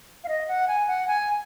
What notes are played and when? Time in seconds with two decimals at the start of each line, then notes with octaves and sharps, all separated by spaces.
0.24 F5
0.28 D#5
0.48 F#5
0.68 G#5
0.88 F#5
1.08 G#5